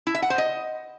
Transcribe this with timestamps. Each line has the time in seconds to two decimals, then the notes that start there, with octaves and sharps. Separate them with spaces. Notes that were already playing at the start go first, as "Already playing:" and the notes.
0.07 E4
0.15 E5
0.22 F#5
0.30 C5
0.38 D#5